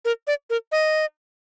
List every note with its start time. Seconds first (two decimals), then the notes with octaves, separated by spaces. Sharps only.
0.05 A#4
0.27 D5
0.50 A#4
0.72 D#5